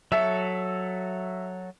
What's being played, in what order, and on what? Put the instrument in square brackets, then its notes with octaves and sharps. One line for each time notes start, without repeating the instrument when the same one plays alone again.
[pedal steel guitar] F#3 A4 C#5 [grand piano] E5